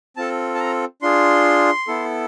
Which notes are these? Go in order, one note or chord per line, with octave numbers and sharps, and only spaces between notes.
C4 F4 A4 A5
A5
A#5
D4 F4 G#4 C6
B3 E4 A4